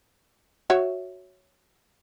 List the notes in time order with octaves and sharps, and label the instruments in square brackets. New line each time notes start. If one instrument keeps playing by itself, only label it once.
[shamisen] F#4 C#5 E5